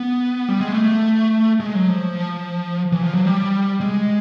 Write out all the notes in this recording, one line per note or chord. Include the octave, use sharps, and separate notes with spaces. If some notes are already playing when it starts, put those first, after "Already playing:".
Already playing: B3
G3
G#3
A3
G#3
F#3
F3
E3
F3
F#3
G3
G#3